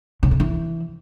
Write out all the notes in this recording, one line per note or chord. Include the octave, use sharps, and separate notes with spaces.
C#3
C3
E3